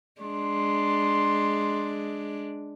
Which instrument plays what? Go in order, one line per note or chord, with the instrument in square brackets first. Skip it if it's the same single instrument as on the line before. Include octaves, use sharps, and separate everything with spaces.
[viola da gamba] G#3 D4 [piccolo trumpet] C6